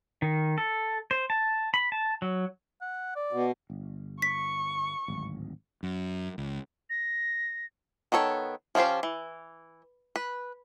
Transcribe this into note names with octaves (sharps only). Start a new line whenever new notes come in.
D#3
A4
C5
A5
B5
A5
F#3
F#5
D5
B2
G1
C#6 B6
D1 G#1
F#2
C#2
A#6
D#3 B3 A4 C#5
F3 C#4 F4 G4 C5
E3
B4